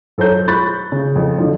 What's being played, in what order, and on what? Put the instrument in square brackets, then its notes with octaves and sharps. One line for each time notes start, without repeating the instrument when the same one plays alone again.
[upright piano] F#2 A4 C5 C#5 A#5 G6
B5 C#6 F#6 G6 A6
C#3
F2
F2 D3 F3 F#3